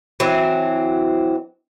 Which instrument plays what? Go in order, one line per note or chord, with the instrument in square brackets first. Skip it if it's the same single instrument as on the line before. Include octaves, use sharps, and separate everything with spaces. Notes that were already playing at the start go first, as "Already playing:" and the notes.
[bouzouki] E3 F#3 C4 E5